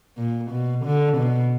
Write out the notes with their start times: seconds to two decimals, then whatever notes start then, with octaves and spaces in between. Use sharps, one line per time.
0.17 A#2
0.51 B2
0.85 D3
1.18 B2